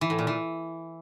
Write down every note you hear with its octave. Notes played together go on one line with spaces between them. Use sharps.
E3
A2
A#2
E3